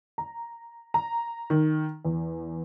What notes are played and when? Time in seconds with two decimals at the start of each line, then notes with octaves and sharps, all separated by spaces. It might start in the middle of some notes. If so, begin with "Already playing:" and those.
0.18 A#5
0.94 A#5
1.50 D#3
2.05 E2